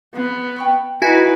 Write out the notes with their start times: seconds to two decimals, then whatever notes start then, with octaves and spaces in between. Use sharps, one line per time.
0.15 B3 G#4 C5
0.56 G5 C#6 F#6
1.02 D#4 E4 F#4 B4 G#5